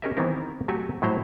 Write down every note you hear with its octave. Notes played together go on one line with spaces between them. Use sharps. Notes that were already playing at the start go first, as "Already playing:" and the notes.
C#4 G4 G#4 A#4 D#5 E5
D#3 E3 B3 C4 E4 A#4
F#3 A3 F#4 G4 A4 G#5
A2 F#3 E4 C5 A#5